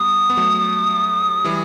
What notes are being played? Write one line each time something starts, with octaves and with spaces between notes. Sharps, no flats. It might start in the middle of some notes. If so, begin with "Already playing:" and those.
Already playing: G3 B3 D#6
B3
F#3 A3
E3 G3